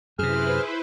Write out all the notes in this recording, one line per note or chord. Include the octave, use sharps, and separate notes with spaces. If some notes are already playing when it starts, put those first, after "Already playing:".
F#2 C3 E4 G#4 B4 C5 F6